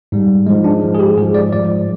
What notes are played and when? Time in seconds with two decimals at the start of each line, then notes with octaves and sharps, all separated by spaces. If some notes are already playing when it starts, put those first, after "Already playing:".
0.12 G#2 G3
0.47 G#2 F3 G#3
0.64 D4
0.82 G#2 F3 G#3
0.95 G#4
0.99 G4
1.17 G#2 F3 G#3 G#4
1.35 D5
1.53 G#2 F3 G#3 D5